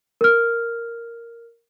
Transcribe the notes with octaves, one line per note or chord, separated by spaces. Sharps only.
A#4 F6